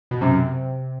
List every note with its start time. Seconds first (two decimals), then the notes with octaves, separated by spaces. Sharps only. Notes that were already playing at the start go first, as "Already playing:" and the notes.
0.11 B2
0.21 F#2 C3